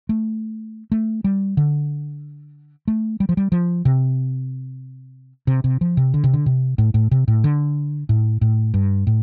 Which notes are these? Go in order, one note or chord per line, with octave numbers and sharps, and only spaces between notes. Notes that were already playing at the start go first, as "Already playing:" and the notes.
A3
A3
G3
D3
A3
G3
F3
G3
F3
C3
C3
C3
F3
C3
D3
C3
D3
C3
A2
A2
C3
A2
D3
A2
A2
G2
A2